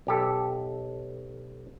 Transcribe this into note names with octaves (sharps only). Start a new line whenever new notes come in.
B1 G4 A4